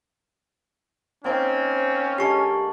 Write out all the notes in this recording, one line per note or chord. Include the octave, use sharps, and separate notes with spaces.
A#3 C4 C#4 D#4
D3 G#3 G4 D5 C#6